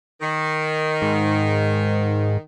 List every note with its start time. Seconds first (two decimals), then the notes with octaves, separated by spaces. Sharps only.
0.21 D#3
1.02 G#2